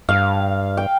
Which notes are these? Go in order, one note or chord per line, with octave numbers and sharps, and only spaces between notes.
G2 F5
G5